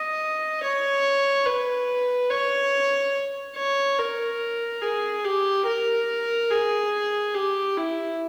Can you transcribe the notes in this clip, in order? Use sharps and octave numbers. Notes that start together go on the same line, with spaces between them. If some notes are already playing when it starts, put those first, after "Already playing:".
Already playing: D#5
C#5
B4
C#5
C#5
A#4
G#4
G4
A#4
G#4
G4
E4